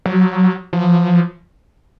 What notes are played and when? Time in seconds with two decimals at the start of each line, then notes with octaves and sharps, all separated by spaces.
0.06 F#3
0.73 F3